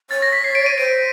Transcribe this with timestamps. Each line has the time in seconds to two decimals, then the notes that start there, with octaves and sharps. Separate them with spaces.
0.10 C#5 A6
0.22 A#6
0.32 B6
0.44 C7
0.55 D7
0.66 D#7
0.78 C5 D7